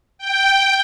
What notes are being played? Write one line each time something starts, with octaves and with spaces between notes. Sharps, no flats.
G5